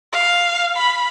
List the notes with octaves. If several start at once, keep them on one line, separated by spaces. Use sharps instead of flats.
F5
B5